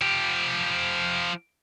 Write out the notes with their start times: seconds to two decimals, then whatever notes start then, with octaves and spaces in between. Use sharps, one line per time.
0.02 F3 G4